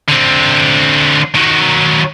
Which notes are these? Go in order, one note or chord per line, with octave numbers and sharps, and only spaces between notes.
D3 C4
D#3 F#3